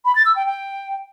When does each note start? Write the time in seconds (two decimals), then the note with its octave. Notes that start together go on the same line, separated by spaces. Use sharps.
0.05 B5
0.15 A6
0.26 E6
0.36 G5
0.46 G5